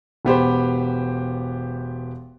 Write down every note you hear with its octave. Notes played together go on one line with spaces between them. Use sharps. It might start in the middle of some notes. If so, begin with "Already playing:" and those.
E1 B3 G4 C5